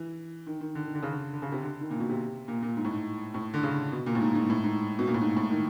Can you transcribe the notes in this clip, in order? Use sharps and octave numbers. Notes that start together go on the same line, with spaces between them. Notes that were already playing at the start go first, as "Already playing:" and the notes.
Already playing: E3
D#3
D#3
D3
D#3
D3
C#3
D3
D3
C#3
C3
D3
D#3
A#2
B2
C3
A#2
A#2
G#2
A2
G#2
A2
D3
C#3
B2
A#2
A2
G#2
G#2
A2
G#2
B2
A#2
A2
G#2
A2
D#3